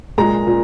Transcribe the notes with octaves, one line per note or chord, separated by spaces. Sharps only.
A#2 G#3 A#5
A#2